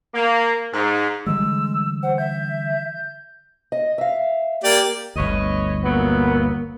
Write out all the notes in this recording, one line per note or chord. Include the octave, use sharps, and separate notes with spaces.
A#3
G#2
D3 E3 G3 G#3 E6
C5 F#5
E5 G6
D#5
E5 F5
A#3 G4 D5
G1 D2 B4 C#5 D#5
F2 E3 F#3 A#3 B3